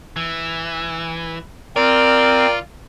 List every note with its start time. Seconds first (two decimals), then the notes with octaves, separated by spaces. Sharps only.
0.16 E3
1.76 C4 F4 A#4 D5